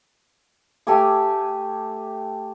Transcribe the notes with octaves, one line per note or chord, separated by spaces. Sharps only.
A3 G4 G#5 D6